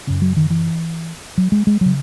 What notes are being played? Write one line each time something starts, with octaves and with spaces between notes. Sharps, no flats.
F#2 C#3 C#4
F#3
D#3
E3
F#3
G#3
G#3
C#3 F#3